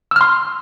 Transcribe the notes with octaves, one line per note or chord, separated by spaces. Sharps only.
C6 E6 F6